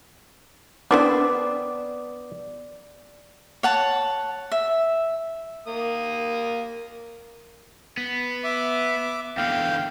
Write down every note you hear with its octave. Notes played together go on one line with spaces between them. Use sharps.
B3 C4 D4 E4 D5
C#5 F#5 A5
E5
A#3 D#6
B3
E5 D6
E2 D3 F5 G5